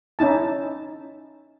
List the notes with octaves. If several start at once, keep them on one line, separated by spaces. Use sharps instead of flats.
C#4 D#4 E4 A5